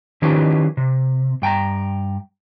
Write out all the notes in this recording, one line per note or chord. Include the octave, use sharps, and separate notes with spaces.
D#3 F3 C#4 E4 G4 B4
C3
G2 G5 A5 A#5